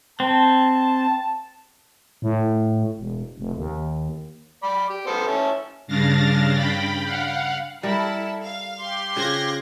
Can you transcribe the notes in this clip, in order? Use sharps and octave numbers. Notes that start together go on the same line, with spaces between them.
C4 A5
A2
E1
F1
D#2
D5 B5
G4
B3 A4 C5
C#4 E5 A5
G2 C#3 D4 F5 A6 A#6
G5 B5
F5 F#5
G3 E4 A4 A#4
F5
G4 C6
C#3 F4 C5 F#6 G#6 A#6